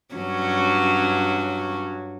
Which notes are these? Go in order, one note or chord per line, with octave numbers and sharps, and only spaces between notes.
G2 F#3 C#4